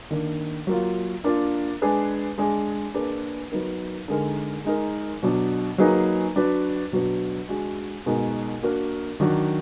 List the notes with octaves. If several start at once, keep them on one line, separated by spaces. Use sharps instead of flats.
D#3 A#3 D4
F#3 A#3 F4
A#3 D4 F4 A#4
G#3 D4 G#4 B4
G#3 D4 G#4
A#3 D4 G#4 B4
F#3 B3 D#4 A#4
D3 G#3 D#4 A#4
G#3 D#4 A#4
B2 F#3 D4
F#3 A#3 D#4 G#4 B4
F#3 D4 F#4 B4
B2 F#3 D4 F#4 B4
G#3 D4 F#4
B2 G#3 D#4 F#4 A#4
A#3 D4 F#4 A#4
D#3 F#3 D4 F#4